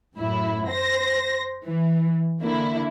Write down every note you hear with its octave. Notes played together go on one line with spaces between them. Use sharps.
F#2 A2 E4
C5 A#6
E3
D3 A#3 E4